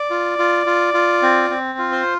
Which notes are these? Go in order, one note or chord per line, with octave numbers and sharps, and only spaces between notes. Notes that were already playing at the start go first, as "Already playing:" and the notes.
Already playing: D5
F4
F4
F4
F4
C4
C4
F4
C5